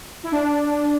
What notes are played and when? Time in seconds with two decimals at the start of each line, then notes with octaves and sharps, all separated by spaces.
0.24 E4
0.32 D4